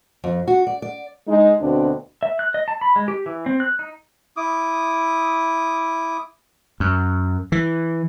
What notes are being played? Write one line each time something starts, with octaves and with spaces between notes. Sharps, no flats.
F2
F#4
D5
D5
G#3 D#4
D2 B2 C4 D4
E5
F#6
D#5
A5
B5
G#3
G4
E3
C4
F#6
D#4
E4 D6 D#6
F#2
E3